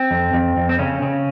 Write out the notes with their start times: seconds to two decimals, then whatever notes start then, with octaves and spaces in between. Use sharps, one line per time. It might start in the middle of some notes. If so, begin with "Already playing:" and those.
Already playing: C4
0.11 F2
0.34 F2
0.57 F2
0.69 C4
0.79 C#3 C#4
1.02 C#3